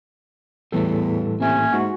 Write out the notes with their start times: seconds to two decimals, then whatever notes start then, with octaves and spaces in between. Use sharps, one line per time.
0.72 E2 A2 E3 G3 A3 B3 A4
1.40 C3 A#3 C#4 E5
1.73 G#2 F#4